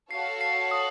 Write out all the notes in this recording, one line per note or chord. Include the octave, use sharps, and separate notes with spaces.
F#4 A4 C#5 F5 C7
C7
D#6